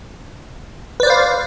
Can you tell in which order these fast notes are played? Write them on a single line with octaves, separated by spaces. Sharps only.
B4 D5 C5 F5